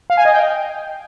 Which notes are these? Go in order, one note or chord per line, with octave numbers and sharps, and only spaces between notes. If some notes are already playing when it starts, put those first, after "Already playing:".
F5
G#5
D#5
G5